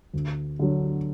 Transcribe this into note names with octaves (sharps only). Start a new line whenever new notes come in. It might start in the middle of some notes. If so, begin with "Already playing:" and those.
D2
D3 F#3